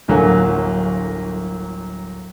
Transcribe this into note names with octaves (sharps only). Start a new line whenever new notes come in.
D1 G1 F#3 A3 A#3 G#5